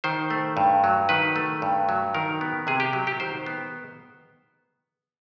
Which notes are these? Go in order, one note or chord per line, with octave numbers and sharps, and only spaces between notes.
D#3 C5
A3
G2
F#3
D#3 B4
A3
G2
F#3
D#3 A#4
B3
C3 G#4
G4
F#3
G4
D#3 C5
B3